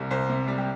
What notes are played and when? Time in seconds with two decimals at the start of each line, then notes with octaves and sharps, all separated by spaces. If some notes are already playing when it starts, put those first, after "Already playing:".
Already playing: C2 C3 G3
0.11 C2 C5
0.29 C3
0.48 G3
0.58 G4